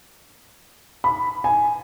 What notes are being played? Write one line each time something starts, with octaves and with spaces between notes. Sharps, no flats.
B5
G#5